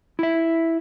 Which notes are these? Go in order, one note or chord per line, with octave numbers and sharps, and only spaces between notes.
E4 E5